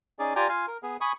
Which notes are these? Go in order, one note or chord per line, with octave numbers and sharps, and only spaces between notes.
C#4 D#4 G#4 D5
F4 G4 D5 G5 G#5 A#5
F4 F5 G#5
A#4
B3 G#4
G#5 B5 C#6 D#6